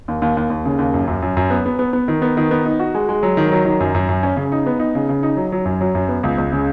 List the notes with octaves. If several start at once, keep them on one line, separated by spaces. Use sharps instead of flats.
D#2
D#2
D#2
D#2
C#3
D#2
F#2
F#2
F#2
F#2
B3
B3
B3
B3
D#3
B3
D#3
B3
D#4
F#4
G#3
G#3
F#3
D#3
F#3
D#3
F#2
F#2
F#2
C#4
C#3
D#4
B3
D#4
C#3
C#3
D#4
F#3
F#3
F#2
F#3
F#2
B3
C#2
C#2
C#3